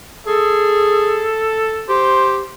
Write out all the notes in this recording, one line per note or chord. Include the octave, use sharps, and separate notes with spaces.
G#4 A4
G4 C5